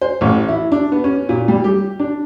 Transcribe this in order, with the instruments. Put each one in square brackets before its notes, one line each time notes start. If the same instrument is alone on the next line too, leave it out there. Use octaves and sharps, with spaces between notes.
[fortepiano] C5
A1
E4
D4
B3
C#4
A#2
G3
G4
D4